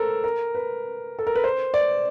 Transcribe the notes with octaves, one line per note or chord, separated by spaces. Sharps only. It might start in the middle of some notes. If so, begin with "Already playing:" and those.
Already playing: A4 A#4 C5
A#4
B4
A4
A#4
B4
C5
D5